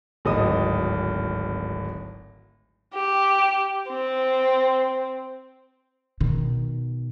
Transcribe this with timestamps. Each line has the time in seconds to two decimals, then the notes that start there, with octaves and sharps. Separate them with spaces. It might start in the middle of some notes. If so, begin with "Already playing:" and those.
0.25 D1 G#1 D#5 D#6
2.94 G4
3.90 C4
6.20 B2 D#3